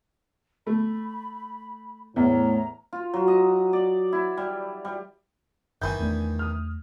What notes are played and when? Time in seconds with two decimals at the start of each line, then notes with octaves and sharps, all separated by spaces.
0.67 A3 B5
2.16 E2 A2 A#5
2.93 F4
3.14 F#3
3.28 D#5
3.73 D5
4.13 E4
4.37 G3
4.85 G3
5.82 F#1 D#3 E3 E4 G#5 B5 G6
5.99 E2 A3 D4
6.39 D#6 F6